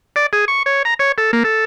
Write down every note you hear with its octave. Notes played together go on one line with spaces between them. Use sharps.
D5
G#4
C#6
C#5
A#5
C#5
A4
A#3
A4